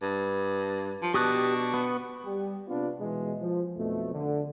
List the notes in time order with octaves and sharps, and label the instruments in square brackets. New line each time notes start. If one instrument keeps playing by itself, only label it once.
[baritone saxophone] G2
F3
[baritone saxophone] B2 [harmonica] D4 A5 C#6 [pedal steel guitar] G4 D#6 F#6
[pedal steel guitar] B3
[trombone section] G3 G4
C3 B3 C4 D4 F4 B4
B2 E3 G#3
F3
B1 F2 B2 A3
D3